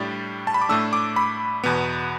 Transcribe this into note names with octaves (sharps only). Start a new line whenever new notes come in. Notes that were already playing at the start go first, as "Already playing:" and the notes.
Already playing: A2 G3 D4 A6
A5
B5
D6
A2 A3 D4 E6
D6
B5
E2 B2 B3